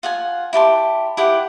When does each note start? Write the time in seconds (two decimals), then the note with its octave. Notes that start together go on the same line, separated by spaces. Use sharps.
0.03 F4 F#5 G#5
0.53 E4 G4 A5 C6
1.17 E4 G4 F#5